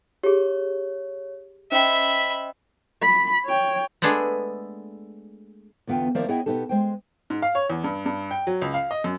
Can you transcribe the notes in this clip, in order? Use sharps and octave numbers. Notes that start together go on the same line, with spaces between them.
G4 G#4 C#5
C#4 C5 D#5 E5 G5 B5
B5
C#5 G5
G#3 A3 B3 D4 G#4
E2 D3 B3 F4 G5
D#3 F3 A#3 C5 D5 E5
B3 E4 G#4 C#5 D#5 G5
B2 B3 D#4 G4 A4
G#3 C5 G5
G#2
F5
C#5
E2
G2
G2
G5
F#3
C#2
F5
D#5
F#2